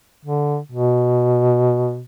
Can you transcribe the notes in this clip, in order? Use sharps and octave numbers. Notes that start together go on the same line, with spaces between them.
D3
B2